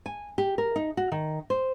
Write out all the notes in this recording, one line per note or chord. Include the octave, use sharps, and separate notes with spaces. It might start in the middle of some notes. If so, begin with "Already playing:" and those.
G#5
G4
A#4
D#4
F#4
D#3
C5